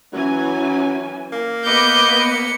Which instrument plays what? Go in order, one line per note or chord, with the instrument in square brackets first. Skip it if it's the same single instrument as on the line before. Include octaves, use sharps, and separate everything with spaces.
[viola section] E3 C#4 G#5 [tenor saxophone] F#3
[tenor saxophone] A#3
[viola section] B3 [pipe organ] B4 D#5 D6 [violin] G6 C#7
[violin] C#7